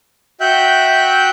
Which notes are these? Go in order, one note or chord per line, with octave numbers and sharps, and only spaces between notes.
F#4 E5 G5 F#6 G6